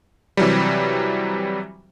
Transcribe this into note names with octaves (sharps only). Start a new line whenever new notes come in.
C3 E3 F#3 G3